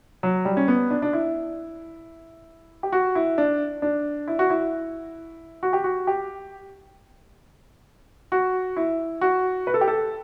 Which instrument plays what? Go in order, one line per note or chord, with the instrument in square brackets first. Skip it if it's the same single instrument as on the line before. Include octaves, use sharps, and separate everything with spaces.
[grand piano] F#3
G3
C#4
B3
D4
D4
E4
G4
F#4
E4
D4
D4
E4
F#4
E4
F#4
G4
F#4
G4
F#4
E4
F#4
B4
A4
G4
A4